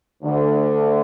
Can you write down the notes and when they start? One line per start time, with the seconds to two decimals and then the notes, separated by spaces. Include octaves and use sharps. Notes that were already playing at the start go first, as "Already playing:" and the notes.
0.24 D2 D3